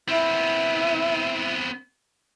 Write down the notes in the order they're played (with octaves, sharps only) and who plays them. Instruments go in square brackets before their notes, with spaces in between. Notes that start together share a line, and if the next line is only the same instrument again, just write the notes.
[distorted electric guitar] B3 C4 [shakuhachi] E4